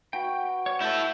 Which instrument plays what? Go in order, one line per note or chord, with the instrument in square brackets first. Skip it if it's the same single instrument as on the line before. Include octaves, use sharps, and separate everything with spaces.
[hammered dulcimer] F#4 B4 [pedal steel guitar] G5
[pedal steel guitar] C#5
[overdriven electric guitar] E4 A4 [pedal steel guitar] G6